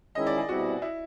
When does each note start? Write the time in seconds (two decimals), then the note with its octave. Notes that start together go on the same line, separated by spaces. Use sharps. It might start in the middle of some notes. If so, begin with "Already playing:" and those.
0.15 D#3 G#3 C#4 E4 D#5
0.26 D5
0.38 G#4
0.49 B2 G3 C4 E4 F#4
0.82 E4